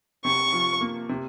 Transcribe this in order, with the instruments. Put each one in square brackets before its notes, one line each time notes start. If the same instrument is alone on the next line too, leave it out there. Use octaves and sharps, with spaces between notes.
[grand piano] C3 [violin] C#6
[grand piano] F3
A#3
C3